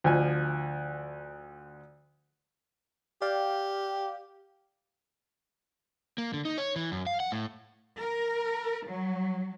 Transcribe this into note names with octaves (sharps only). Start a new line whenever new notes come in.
D2 F3 G#5
G4 D5 F5 G5
A#3
D3
D#4
C#5
E3
F#2
F5
F#5
A2
A#4
F#3